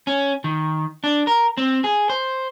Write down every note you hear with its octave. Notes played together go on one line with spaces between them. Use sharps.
C#4
D#3
D4
A#4
C4
G#4
C5